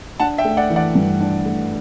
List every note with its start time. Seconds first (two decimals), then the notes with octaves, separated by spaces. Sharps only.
0.20 D4 F#5 A5
0.38 E5 G5
0.45 A3
0.57 D5 F#5
0.70 E3
0.76 D5 F#5
0.95 G2
1.20 D4
1.45 A3